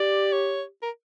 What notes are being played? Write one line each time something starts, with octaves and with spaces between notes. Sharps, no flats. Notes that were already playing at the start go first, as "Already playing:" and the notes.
Already playing: G4 D5
C#5
A#4